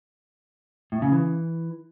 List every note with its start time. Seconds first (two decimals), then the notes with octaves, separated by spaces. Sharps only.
0.92 A2
1.02 C#3
1.12 E3